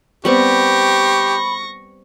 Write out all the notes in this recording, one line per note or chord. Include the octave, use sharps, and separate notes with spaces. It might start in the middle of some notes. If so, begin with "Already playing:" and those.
G3 B3 C4 G4 B5 C#6 A#6